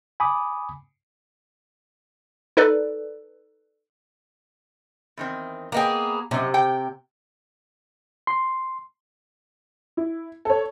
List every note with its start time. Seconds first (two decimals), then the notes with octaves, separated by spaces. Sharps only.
0.20 G#5 B5 D6 D#6
2.57 D#4 A4 B4 D5
5.17 E2 D#3 C4
5.72 A#3 B3 G#4 B4 D#5 G5
6.31 F#2 C3 D#4
6.54 G5
8.27 C6
9.97 E4
10.45 A4 C#5